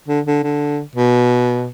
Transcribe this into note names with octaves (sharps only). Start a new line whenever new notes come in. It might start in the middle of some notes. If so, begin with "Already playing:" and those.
D3
D3
D3
B2